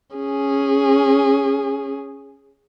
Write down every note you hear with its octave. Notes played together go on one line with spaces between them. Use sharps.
C#4 G#4